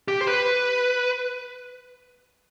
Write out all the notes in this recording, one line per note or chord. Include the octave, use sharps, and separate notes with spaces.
G4
C5
B4